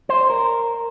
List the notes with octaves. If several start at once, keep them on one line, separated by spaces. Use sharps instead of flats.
C5
A#4